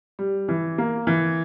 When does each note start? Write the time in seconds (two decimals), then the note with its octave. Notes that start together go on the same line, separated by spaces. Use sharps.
0.19 G3
0.48 E3
0.78 A#3
1.07 E3